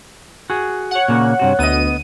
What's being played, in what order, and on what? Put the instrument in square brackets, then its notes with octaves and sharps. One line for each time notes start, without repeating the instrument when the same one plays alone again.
[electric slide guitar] F#4 G#4
[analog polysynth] C#5 F#5
[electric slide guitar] A#2 C#3 A#3
G2 C3 F#4
[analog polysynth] D2 D#7 [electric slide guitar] B3 D#5